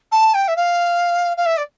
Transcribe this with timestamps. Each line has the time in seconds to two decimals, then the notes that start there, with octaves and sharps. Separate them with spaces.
0.12 A5
0.34 G5
0.48 E5
0.56 F5
1.37 F5
1.46 E5
1.57 D5